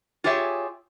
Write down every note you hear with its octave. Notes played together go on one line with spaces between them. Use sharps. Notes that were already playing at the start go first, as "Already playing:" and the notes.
F4 G4 G#4 C#5 E5